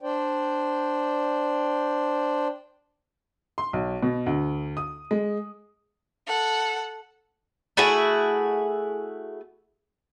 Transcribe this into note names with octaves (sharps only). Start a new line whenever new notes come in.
D4 C5 D5 G5
C6
B1
B2
D2
D#6
G#3
A4 F#5
A3 E4 F#4 G#4